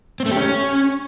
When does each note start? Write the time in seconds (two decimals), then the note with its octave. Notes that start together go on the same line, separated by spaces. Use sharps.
0.20 C4
0.26 A3
0.31 G4
0.37 C#4